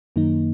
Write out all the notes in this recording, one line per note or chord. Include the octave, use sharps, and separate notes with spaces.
F#2 D#3 A#3 D#4